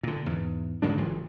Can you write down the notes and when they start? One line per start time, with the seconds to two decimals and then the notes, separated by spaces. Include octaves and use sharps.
0.03 A#2 D3
0.26 E2 G#2
0.82 G#2 C#3 G#3 D4
0.98 F#1 E3 F3